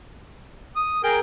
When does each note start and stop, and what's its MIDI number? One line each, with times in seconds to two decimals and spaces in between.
0.76 1.02 87
1.03 1.20 68
1.03 1.20 70
1.03 1.19 79